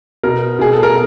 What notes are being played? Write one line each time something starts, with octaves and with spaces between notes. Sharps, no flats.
B2 A#4
B2 G#4
A4
A#4